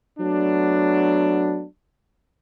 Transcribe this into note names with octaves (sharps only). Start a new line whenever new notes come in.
F#3 A3 B3 D4